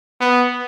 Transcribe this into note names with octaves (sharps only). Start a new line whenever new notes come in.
B3